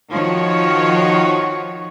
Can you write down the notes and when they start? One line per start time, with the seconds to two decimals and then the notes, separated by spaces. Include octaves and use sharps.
0.10 D#3 F3 F#4 C#5